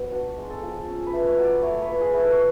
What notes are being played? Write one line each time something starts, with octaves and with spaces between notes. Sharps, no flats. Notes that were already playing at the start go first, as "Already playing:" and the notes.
Already playing: F#3 B3
D4 F#4
G#3
A4
F3
A4
C#4
B4
A3
C#5
F#3
D5
A3 C#5
B4
F4
G#4
A3 B4
A4
C#5